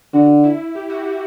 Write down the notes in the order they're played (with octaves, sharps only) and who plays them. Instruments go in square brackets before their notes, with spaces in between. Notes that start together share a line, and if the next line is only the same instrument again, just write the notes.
[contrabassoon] D3 [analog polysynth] F#4
[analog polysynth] E4
G4
F#4
E4